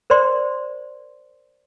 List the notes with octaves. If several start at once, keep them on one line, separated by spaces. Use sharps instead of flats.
A#4 C5 D5 C6